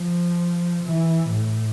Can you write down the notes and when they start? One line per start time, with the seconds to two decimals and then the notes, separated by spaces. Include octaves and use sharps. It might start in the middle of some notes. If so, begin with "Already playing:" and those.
Already playing: F3
0.85 E3
1.31 A2